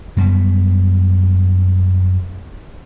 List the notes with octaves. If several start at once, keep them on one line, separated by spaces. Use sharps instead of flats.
F#2 G3 B3